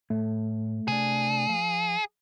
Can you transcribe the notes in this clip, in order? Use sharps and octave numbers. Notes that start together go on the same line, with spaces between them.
A2 A3
C3 D4 G#4
F3 F5